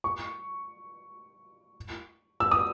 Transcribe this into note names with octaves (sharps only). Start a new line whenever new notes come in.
C#6
E6
D#6